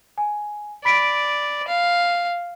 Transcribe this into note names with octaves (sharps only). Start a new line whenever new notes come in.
G#5
D5 B5 B6 D7
F5